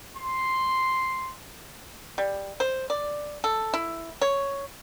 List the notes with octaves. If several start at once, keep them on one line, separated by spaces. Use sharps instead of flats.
C6
G3
C5
D5
A4
E4
C#5